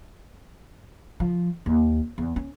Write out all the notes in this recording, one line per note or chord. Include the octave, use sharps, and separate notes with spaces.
F3
D#2
E2
C#4